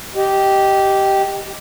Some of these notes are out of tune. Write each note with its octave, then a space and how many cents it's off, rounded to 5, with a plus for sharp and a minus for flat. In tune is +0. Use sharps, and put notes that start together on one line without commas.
G4 -10 D#5 +0